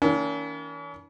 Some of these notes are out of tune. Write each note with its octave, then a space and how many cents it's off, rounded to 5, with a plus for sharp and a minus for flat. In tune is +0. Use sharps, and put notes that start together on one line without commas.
E3 -40 A#3 -5 C#4 +45